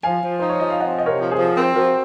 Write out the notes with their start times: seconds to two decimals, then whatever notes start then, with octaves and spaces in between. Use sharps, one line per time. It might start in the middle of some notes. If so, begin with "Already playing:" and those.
0.03 F3 F5 G#5
0.23 F3
0.39 D#4 C5
0.49 C#5
0.60 F3 D#5
0.70 F5
0.80 C4 D#5 F#5
0.98 C3 D#5
1.06 A#4 C#5
1.19 F3
1.31 G#4 C5
1.38 F3
1.57 C4 A#4
1.66 C5
1.76 F3 F#4 A#4